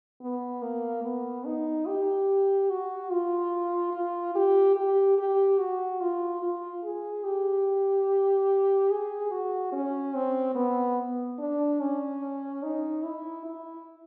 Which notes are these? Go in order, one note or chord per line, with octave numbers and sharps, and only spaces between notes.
B3
A#3
B3
D#4
G4
F#4
F4
F4
G4
G4
G4
F#4
F4
F4
G#4
G4
G#4
F#4
C#4
C4
B3
D4
C#4
D#4
E4
E4